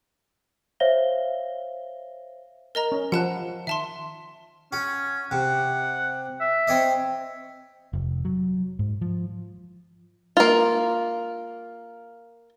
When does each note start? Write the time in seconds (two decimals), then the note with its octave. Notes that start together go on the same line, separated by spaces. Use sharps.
0.80 C5 C#5 E5 F5 A#6 G7
2.75 A#4 D#5 A#5
2.92 C#4
3.12 F3 F#5 A5 F#6
3.67 D#3 E5 A5 C6
4.73 C#4 F#4
5.31 C3 F#5
6.41 E5
6.68 C4 C#5 D#5
7.93 F1
8.25 F#3
8.79 G#2
9.01 F3
10.37 A#3 F4